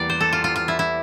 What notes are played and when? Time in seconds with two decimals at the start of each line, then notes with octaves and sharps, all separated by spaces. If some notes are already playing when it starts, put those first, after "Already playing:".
Already playing: E2 E3 G3 A#3 G4 D5
0.10 C5
0.21 A4
0.33 F4
0.44 F4
0.56 F4
0.68 E4
0.79 E4